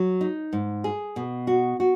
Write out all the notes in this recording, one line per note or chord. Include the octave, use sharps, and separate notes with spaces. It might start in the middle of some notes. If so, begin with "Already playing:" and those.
Already playing: F#3
D#4
G#2
G#4
B2
F#4
F#4